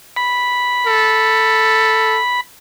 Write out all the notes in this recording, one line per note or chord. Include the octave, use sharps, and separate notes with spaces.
B5
A4